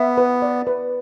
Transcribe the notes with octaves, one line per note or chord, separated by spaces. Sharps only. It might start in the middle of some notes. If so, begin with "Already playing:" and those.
Already playing: B3 E5
B4
D5
B4